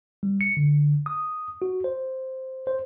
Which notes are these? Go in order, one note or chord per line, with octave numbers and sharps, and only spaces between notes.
G3
C#7
D3
D#6
F#4
C5
C5